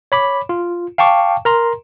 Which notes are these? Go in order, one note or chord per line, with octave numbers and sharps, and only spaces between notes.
C#5 B5 D6
F4
F5 G5 A5 C#6 D6
A#4 A#5 C6